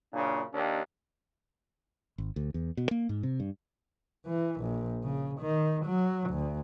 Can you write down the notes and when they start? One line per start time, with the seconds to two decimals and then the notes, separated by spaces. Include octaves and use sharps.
0.13 F#2 A#2 C#3 D4
0.52 D#2 D4
2.18 G#1
2.36 D2
2.54 E2
2.77 B2
2.91 A#3
3.09 G#2
3.23 C3
3.40 G2
4.27 E3
4.61 A#1
5.04 C#3
5.41 D#3
5.86 F#3
6.30 D2